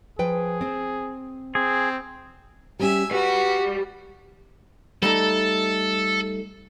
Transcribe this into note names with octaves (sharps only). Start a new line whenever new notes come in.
F3 G#4 B4 G5
C4 C5
C4 G#4
G3 C#4 G4 E5 G#5
G3 F#4 G4 B4
G3 A3 D#4 A4